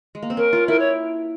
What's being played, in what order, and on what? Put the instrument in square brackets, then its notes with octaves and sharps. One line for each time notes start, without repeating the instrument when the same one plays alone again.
[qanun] G#3
A#3
C4
[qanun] C#4 [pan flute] A#4
[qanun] F4
[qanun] E4 [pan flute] A#4
[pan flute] C#5